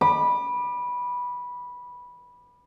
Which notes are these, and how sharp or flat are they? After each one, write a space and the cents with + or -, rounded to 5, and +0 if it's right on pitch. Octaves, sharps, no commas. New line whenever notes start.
B5 -10 D6 +30